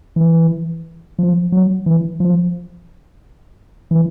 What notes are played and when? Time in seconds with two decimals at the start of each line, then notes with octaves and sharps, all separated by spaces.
0.16 E3
1.19 F3
1.52 F#3
1.86 E3
2.20 F3
3.91 E3